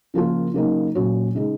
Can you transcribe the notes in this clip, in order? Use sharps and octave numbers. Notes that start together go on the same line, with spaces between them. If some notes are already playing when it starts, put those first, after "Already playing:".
C#3 F3 A#3 F4 A#4
C#3 F#3 A#3 D#4
A#2 F#3 C#4 F#4 C#5
C#3 G#3 D#4 G#4